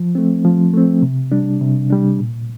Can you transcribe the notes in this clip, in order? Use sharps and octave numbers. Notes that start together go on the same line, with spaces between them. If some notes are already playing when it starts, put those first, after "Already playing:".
Already playing: F3
A3 C4
F3
A3 C4
C3
G3 D4
C3
G3 D4
A#2